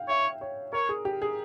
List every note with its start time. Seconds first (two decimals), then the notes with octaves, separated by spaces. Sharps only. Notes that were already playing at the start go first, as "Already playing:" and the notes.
Already playing: F5 G5
0.08 C#5 E5
0.41 C#5
0.73 A#4 C#5
0.89 G#4
1.05 G4
1.22 G#4